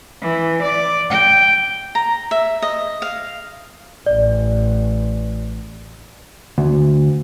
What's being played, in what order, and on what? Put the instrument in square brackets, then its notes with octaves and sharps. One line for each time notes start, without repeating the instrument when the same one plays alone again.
[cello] E3
D5
G5
[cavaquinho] A#5
E5
D#5
F5
[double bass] A1 [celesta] D5
[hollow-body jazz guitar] D2